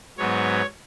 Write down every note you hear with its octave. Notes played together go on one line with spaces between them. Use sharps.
G#2 F#3 B3 C#5